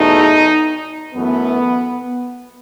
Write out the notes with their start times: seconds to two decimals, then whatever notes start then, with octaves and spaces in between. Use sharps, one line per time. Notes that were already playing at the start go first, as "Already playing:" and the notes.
Already playing: E2 B2 A3 D#4
1.14 F#2 E3 A3 B3